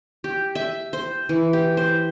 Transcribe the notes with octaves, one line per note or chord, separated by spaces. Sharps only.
G4
E5
C5
E3
G4
C5